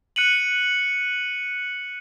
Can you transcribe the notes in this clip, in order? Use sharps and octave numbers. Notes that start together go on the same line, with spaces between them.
F#6 C#7 D#7 F#7